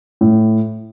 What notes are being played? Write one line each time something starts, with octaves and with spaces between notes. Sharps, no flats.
A2